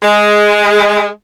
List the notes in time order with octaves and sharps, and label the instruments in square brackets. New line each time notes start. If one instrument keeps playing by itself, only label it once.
[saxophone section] G#3